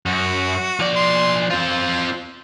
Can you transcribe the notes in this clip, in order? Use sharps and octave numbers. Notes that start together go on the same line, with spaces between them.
F#2 F#4
F3 D5
C6
C4 F4 C5